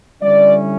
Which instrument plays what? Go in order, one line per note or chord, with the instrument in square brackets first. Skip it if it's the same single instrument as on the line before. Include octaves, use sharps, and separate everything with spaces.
[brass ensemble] D3 G3 C#4 E4 D5